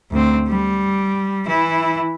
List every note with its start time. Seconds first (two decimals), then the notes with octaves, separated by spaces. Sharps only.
0.11 D2 C4
0.48 G3
1.47 E3 E4